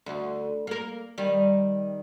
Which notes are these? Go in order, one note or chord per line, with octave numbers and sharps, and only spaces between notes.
D2
A#3 A#4
D#3 G3